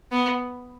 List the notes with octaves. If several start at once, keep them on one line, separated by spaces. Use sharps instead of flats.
B3